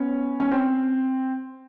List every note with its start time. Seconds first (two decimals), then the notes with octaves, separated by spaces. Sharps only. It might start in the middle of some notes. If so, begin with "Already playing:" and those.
Already playing: B3 C#4
0.40 C#4
0.51 C4